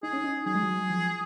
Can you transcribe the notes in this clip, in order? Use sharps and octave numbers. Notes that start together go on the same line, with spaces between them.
D#4 G#4
C#4
D#4
F#3 G#4
G#3
F#3
F3